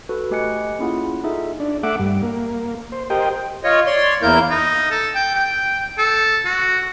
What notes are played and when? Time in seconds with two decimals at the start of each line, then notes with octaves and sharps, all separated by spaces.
0.09 F#4 A4 B4
0.31 A3 G4 D#5 G#5 F#6 C#7
0.79 A#3 C#4 E4 F4 G#4 F#5
1.24 D#4 F4 G#4 A4 E5
1.60 D4
1.83 A3 E5 F#5 D6
1.99 G2
2.23 A#3
2.92 C5
3.10 G4 A#4 C5 D#5 G5
3.64 F4 C#5 D#5
3.86 C#5 D5 C6
4.22 E2 A#3 E4 A#4 G6
4.50 D#4
4.91 A4
5.15 G5
5.35 G5
5.98 A4
6.46 F#4